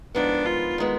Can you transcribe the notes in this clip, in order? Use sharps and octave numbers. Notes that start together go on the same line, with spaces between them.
F2 D#3 G#3 B3 D4
F4
D#3 G#3 B3